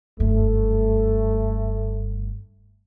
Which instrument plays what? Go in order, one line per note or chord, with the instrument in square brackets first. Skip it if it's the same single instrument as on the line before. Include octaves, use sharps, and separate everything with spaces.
[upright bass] F#1 G2 [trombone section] A3